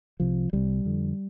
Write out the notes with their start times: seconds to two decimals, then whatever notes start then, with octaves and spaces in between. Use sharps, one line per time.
0.20 C2 C3 F3
0.53 C2 D3 G3
0.56 C3
0.85 F2 D3